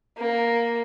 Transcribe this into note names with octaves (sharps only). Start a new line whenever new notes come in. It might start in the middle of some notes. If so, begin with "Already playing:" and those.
A#3